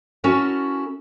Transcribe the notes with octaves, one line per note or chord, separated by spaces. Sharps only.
C#4 E4 F#4 A4 A#4